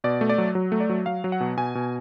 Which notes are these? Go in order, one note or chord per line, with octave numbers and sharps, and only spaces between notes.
B2 D5
A3
D5
F#3
F#3
A3
D5
F#3
F#3 F5
F#3
F#5
B2
B2 G#5
B2